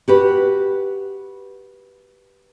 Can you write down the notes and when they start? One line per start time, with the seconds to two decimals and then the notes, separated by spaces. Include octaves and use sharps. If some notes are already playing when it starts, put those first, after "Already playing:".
0.08 F#4 G4 B4